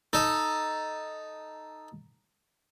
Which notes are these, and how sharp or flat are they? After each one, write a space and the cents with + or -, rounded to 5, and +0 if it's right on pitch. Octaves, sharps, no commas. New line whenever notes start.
D#4 +0 A4 +0